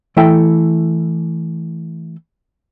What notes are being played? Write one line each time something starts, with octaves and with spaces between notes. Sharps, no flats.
E3 A3 E4 A4 E5 G5